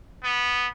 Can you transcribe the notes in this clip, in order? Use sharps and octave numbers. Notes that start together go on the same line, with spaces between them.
B3